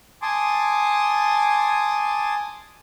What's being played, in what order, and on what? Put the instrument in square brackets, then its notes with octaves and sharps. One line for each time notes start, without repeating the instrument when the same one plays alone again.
[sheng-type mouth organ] G#5 A5 C6 D6 D#6